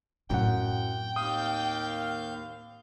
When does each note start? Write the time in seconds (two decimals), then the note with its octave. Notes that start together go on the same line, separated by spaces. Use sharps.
0.30 F#2 A2 C4 F#5 G5
1.16 D#2 F5 D#6 G6